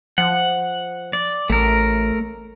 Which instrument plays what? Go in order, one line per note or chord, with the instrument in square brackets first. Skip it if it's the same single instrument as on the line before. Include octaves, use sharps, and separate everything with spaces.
[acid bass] F3 [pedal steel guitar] F#5
[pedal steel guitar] D5
[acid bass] A1 [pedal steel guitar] A3 A#4